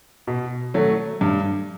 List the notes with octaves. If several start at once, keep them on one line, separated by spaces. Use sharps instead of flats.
B2
F#3 A3
G2